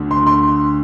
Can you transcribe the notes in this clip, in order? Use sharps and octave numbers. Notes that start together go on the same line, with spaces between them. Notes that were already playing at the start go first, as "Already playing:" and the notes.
Already playing: D2 D3 A3 D4
C6
C6